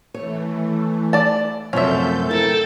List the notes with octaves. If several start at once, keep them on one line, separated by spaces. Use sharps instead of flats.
E3 A3 C#5
D5 A5
F#2 C3 F3 A3 C#4 A4 E5 G6
E4 A4 A#4 G5 A6